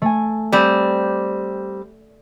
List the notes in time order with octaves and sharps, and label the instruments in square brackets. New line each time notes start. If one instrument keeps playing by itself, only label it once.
[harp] A3 G#5
[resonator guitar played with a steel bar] G3 C4 [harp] D5